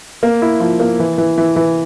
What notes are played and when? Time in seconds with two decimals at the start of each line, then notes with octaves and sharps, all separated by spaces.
0.23 A#3
0.42 E4
0.60 F3
0.80 A#3
0.99 E3
1.18 E3
1.38 E3
1.56 E3